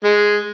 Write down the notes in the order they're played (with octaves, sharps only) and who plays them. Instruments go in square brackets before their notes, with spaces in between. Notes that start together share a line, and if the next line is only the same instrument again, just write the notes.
[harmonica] G#3